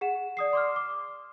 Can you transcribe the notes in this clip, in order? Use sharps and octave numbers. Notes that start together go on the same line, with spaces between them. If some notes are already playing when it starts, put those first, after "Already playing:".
G#4 F#5 E7
D5 D#6 C7
C6 D6 F6
D6